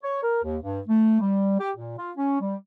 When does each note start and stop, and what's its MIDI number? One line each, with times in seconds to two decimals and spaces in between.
0.03 0.21 73
0.22 0.39 70
0.43 0.56 39
0.62 0.80 43
0.87 1.20 57
1.20 1.57 55
1.60 1.70 67
1.76 1.96 46
1.98 2.10 65
2.17 2.39 61
2.40 2.56 55